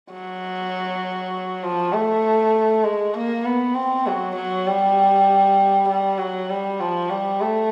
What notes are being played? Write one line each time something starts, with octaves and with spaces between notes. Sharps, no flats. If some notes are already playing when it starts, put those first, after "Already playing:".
F#3
F3
A3
G#3
A#3
B3
C4
F#3
F#3
G3
G3
F#3
G3
F3
G3
A3